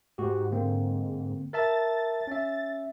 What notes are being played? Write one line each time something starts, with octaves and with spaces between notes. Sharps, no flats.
G#2 F#4 G4
D3 A#3 C4
A#4 E5 A5 A6
C#4 E5